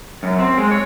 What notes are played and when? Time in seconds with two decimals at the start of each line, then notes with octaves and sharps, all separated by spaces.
0.23 F#2
0.39 C4
0.58 G#3
0.71 C#5